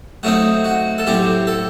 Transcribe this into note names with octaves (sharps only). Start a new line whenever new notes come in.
F#3 A3 C4 D#4 F#4
F#4
A4
A2 F#3 C4 G4
A4